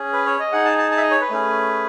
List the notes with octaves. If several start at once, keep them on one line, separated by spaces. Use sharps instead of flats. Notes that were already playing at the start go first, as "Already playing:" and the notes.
Already playing: C#4 G#4
B4
C#5
D#5
D#4 G#4 F#5
A5
A5
A5
E5
D#5
C#5
B4
A3 C#4 G#4